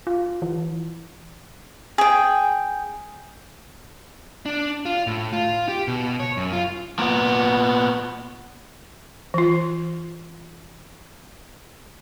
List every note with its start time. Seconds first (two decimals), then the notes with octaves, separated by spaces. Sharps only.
0.07 F4
0.42 E3
1.98 G#4 G5
4.46 D4
4.86 F4
5.07 A2
5.33 F4
5.68 G4
5.88 B2
6.20 C#5
6.37 F#2
6.53 F4
6.99 A#2 B3
9.34 E3 F4